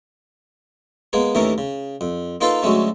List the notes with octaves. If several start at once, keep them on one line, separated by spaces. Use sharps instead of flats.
G#3 A#3 B3 G#4
D#2 A2 E3 C#4 A#4
C#3
F2
A#3 D#4 F4 A4 B4 F5
D2 F#3 G#3 A3 C#4